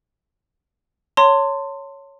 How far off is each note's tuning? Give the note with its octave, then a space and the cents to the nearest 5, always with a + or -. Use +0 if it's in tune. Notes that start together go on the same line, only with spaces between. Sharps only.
C#5 +0 A5 +40 C6 -5